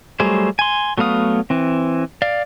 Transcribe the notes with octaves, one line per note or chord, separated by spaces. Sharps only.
F#3 G3 A3 G#4 C5
G#5 C6
F#3 A3 B3 F5 D#6
E3 C4
D5 F5